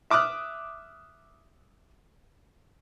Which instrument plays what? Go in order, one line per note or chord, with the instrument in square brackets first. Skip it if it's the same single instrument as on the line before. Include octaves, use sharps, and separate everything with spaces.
[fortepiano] E5 D6 D#6 F6 F#6